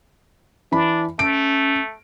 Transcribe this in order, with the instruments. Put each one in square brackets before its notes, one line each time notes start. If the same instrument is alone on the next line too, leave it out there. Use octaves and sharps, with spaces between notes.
[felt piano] E3 B5 [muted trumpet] D4
[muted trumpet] A3 [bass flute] C#4 [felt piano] D7